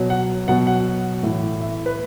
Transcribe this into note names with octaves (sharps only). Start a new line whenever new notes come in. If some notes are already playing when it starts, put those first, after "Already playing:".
Already playing: B2 F#3
F#5
B2 F#3 F#5
F#5
A2 E3
E5
B4